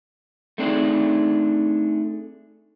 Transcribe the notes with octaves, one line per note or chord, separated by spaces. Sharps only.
A3 C4 D4 D#4 G#4